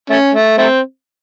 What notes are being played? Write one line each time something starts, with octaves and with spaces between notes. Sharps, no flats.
A3 C#4
A3
A3 C4